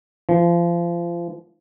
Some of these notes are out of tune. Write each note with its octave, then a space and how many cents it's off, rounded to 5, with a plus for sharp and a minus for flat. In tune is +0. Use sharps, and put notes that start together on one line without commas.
F3 -30